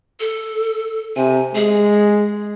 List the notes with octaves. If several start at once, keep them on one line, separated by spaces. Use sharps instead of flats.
A4
C3 G#5
G#3 G#4